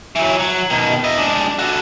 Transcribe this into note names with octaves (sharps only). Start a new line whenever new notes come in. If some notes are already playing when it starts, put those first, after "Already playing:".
E3 F#3
F#3
B2 D#3
E4 D#5
G#3 D4
F#4 A4